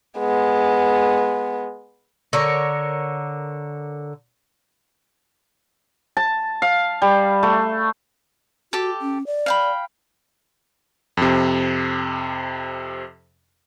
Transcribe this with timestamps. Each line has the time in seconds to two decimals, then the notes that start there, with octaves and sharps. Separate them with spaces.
0.19 G#3 B3
2.33 D3 A#4 C#5
6.17 A5
6.62 F5
7.02 G3
7.43 A3
8.73 F#4 G4 A4 D6
9.02 C#4
9.27 D5
9.46 F5 G5 B5
11.17 F2 C3